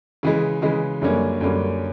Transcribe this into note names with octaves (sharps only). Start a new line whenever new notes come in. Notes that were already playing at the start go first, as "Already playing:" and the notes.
C#3 E3 G#3
C#3 E3 G#3
F#2 D3 G3 A#3 C#4
F#2 D3 G3 A#3 C#4